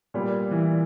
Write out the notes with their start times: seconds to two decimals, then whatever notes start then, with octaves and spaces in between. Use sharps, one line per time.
0.14 A#2 G3 B3
0.51 E3